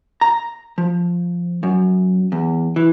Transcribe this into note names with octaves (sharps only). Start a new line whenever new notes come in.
A#5
F3
F#2
E2
E3